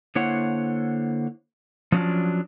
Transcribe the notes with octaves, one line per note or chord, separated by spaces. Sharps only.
D3 A#3 E4 C5 C#5 F#5
F3 F#3 C#4 D4 F4